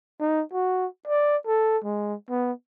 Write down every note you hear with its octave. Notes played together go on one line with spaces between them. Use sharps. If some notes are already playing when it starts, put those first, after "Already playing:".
D#4
F#4
D5
A4
G#3
B3